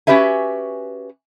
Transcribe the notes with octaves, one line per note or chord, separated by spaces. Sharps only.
C#4 F#4 G4 B4 E5 G#5